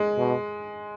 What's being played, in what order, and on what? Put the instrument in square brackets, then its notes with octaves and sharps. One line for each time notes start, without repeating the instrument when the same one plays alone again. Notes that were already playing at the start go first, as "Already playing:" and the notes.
Already playing: [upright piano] G#3
[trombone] B2